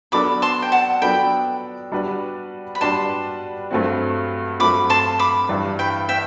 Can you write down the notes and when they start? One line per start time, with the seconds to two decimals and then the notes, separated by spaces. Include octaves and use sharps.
0.12 F#3 B3 D4 A4 B5 D6
0.42 A5 C6
0.62 G5
0.72 F#5 A5
1.02 F#3 B3 D4 A4 G5 B5
1.92 G3 D4 F#4 B4
2.75 B5
2.81 G3 D4 F#4 B4 A5 C6
3.71 G2 F#3 A3 C4 F#4
4.60 G2 F#3 A3 C4 F#4 B5 D6
4.90 A5 C6
5.19 B5 D6
5.49 G2 E3 G3 D4
5.79 G5 B5
6.09 E5 G5